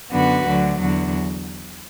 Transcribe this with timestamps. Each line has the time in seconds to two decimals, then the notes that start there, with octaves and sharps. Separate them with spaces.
0.11 F#2 D3 B3 F#4 B4
0.45 D2 D3 F#3
0.79 E2 D3 F#3